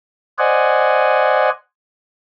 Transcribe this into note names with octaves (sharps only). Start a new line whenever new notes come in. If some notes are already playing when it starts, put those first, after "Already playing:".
C5 D5 D#5 F#5 G#5